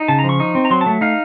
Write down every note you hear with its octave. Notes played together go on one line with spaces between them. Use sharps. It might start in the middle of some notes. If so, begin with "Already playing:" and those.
Already playing: D#4
C#3 A5
A#5
F3
C#6
D#4
C4
A#5
F#3 C6
A5
A3
D#4 F5